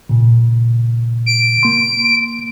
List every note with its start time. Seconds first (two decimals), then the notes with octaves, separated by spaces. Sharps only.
0.09 A#2 C#3
1.26 D7
1.63 A#3 C6